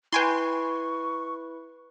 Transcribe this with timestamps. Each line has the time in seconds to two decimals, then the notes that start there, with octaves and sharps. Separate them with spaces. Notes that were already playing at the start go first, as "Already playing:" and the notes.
0.13 E4 B4 G5 G#5 C6 C#6